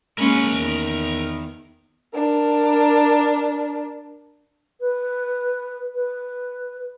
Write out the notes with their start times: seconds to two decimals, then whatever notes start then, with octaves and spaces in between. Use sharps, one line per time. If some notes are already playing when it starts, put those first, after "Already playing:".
0.18 G#3 A#3 C#4 A#4 B5
0.49 E2 D#3
2.14 D4 A#4
4.80 B4
5.94 B4